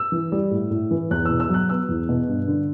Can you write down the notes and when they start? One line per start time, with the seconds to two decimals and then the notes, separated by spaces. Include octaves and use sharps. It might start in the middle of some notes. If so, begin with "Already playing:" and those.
Already playing: E6
0.12 E3
0.32 G3
0.51 A2
0.71 A2
0.91 E3
1.11 E2 F#6
1.25 B2 E6
1.40 E6
1.49 F#3 F#6
1.69 B3 E6
1.89 E2
2.09 B2
2.29 G2
2.48 D3